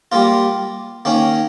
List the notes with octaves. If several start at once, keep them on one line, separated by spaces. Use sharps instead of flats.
G3 A#3 F4
D#3 A#3 C#4